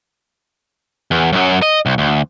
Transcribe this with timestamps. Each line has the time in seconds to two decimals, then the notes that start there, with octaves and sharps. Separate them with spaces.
1.11 E2
1.33 F#2 F#3
1.62 D#5
1.86 C2
1.98 D2